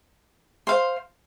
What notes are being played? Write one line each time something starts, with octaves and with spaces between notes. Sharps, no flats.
C5 F5 C6